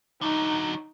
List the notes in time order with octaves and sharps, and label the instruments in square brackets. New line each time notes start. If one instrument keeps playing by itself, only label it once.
[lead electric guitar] D3 F#3 [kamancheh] D#4